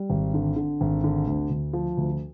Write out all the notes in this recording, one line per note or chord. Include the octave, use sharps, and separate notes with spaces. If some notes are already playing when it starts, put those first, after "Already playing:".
Already playing: G3
G#1
D3
D3
G#1
D3
D2
D2
F3
D2